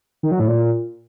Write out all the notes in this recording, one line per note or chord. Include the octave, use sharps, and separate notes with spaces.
D#3
F#3
A2
A#2